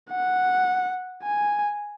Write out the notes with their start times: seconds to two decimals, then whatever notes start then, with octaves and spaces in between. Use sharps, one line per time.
0.10 F#5
1.23 G#5